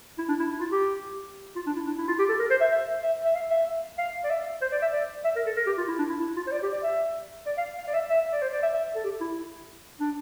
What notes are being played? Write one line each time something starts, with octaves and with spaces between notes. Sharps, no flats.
E4
D4
E4
E4
F4
G4
F4
D4
E4
D4
E4
F4
G4
A4
A#4
C5
E5
E5
E5
E5
F5
E5
F5
D5
E5
C5
D5
E5
D5
E5
A#4
A4
A#4
G4
F4
E4
D4
E4
E4
F4
C5
D5
G4
D5
E5
D5
F5
F5
D5
E5
E5
D5
C5
D5
E5
E5
A4
G4
E4
D4